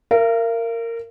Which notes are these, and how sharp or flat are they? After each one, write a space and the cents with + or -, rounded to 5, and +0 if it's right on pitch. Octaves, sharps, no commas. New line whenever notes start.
A#4 -15 F5 -45